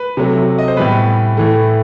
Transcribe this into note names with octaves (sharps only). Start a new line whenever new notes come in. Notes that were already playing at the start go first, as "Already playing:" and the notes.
Already playing: B4
C3 F#3 A3
D#5
C5
A2 E3 G3 B3 B4
A2 E3 A3